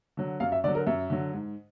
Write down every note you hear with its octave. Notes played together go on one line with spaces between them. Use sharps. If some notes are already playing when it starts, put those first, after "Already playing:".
D3 F#3
F#2 F5
E5
D3 F#3 D5
A#4
F#2 E5
D3 F#3
G#2